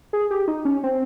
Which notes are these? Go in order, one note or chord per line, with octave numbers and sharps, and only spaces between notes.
G#4
G4
D#4
C#4
C4